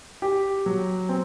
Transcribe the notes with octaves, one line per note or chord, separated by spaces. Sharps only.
G4
F#3
C4